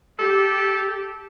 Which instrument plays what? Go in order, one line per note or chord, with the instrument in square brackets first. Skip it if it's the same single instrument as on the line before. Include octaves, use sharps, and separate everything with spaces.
[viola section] G4 [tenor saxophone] A4